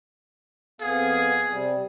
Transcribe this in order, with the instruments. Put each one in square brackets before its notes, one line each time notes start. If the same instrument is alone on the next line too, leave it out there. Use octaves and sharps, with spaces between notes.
[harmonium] F2 B3 F5 [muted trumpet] G#4
[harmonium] C3 G3